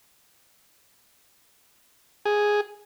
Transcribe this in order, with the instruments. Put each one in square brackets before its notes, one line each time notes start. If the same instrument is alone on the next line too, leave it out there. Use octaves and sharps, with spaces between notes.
[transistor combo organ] G#4